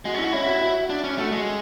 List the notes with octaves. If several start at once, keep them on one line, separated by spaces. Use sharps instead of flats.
G#3 F#4
C#4 E4
F#4
C#4 E4
F#4
F#4
D4
C#4
A3 F#4
G#3